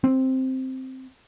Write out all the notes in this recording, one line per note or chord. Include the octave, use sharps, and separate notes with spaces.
C4